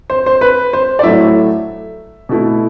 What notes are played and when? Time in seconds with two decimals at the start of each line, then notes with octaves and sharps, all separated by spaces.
0.10 C5
0.26 C5
0.41 B4
0.73 C5
0.99 D5
1.03 A2 F#3 A3 E4 E5
2.29 B2 A3 E4